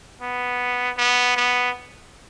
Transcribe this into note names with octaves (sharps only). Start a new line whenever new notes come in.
B3
B3
B3